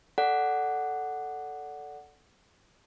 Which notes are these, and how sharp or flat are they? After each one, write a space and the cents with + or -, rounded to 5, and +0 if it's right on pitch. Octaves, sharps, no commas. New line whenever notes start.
A4 +0 D5 -15 F#5 +0